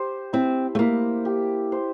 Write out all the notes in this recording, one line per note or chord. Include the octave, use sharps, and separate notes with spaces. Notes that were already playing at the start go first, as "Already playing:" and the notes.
Already playing: G4 C5
C4 E4
A3
A#3 E4
G4
C5